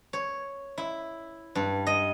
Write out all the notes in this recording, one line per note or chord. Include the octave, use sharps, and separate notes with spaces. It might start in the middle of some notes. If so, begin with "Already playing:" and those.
C#5
E4
G2
D#5